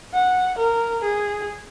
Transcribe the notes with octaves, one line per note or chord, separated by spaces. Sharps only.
F#5
A#4
G#4